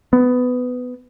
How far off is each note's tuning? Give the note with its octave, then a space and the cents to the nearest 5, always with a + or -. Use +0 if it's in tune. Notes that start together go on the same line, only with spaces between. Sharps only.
B3 +15